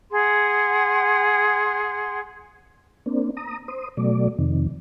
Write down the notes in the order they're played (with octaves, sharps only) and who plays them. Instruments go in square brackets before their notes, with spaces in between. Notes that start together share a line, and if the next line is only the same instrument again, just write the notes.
[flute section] G#4 F#5 C6
[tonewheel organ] A#3 C4 D4
A#5 D#6
C5 D#6
B2 F#3 A3 D5
F2 C3 D#3